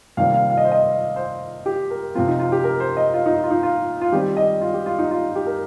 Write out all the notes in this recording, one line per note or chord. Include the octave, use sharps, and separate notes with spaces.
C3 D#3 G3 A#3 F5
F5
F5
D#5
C5
D#5
C5
G4
A#4
C3 F3 C4 F4
D#4
F4
G4
A#4
C5
D#5
F4
D#4
F4
D#4
F4
F4
D#3 G3 C4 G4
D#5
F4
G4
F4
D#4
F4
G4
A#4